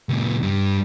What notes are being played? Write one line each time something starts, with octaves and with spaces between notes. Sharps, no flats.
C#2 A#2
G2 G3